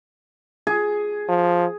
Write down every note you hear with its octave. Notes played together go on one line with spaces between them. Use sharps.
G#4
F3